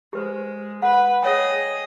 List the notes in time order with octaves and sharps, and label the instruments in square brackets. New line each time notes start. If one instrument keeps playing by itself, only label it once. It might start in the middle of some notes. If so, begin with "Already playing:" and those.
[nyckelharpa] G#3 [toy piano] G4 B4 C5
[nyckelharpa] B4 [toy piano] F#5
[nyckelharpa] G#4 D#5 [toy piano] C#5 G5